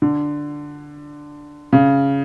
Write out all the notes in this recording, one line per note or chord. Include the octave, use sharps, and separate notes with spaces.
D3
C#3